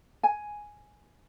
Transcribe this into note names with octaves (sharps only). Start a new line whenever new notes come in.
G#5